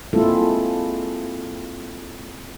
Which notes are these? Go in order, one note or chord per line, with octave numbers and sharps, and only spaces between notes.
G#3 A#3 C4 E4 F4 A4